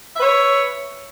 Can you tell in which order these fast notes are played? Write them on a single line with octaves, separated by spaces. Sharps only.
E5 B4 C#5